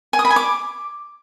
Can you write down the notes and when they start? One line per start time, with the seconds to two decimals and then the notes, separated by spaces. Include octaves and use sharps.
0.13 G#5
0.19 D#6
0.25 B5
0.30 G#5
0.36 D6